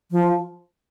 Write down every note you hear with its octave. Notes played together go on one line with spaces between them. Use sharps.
F3